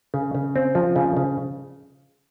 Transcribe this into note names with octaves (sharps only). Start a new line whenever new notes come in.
C#3
C#3
C4
F3
C#3
C#3